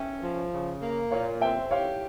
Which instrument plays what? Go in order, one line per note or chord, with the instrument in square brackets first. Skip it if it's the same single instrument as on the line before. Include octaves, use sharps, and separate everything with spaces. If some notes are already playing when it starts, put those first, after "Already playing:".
Already playing: [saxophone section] C#4 [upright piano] E5 G5
[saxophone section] F3
C#3
A#3
[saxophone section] A#2 [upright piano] C#5 F5
[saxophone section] C4 [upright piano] E5 G5
[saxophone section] G4 [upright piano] C#5 F5